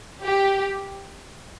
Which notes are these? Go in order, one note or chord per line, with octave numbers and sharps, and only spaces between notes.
G4